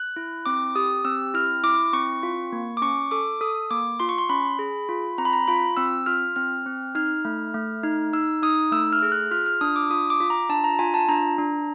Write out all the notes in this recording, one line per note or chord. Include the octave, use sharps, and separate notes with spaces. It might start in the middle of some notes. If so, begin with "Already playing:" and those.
Already playing: F#6
E4
C4 D6
G4 D#6
C4 E6
E4 F6
E4 D6
C4 C#6
F4
A#3
D6
C#4 C#6
A4 D6
A4 D#6
A#3 D6
F4 C6
C#6
C6
C#4 B5
G#4
F4
C4 A#5
B5
A#5
F4 B5
C4 E6
F4 F6
C4 F6
C4
D#4 F6
A3
A3
D#4
D#4 E6
D#4 D#6
A3 E6
F6
G#4
F#6
F4 F6
F6
D4 D#6
D6
F4 D#6
D6
F4
A#5
D4 A5
A#5
F4 G#5
A5
D4 A#5
D4